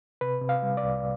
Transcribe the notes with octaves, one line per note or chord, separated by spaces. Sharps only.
C3 B4
C3
F5
G3
D5
C2